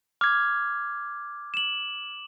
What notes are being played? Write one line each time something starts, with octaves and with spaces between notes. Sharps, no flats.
D6 F6 G#6
E7 F#7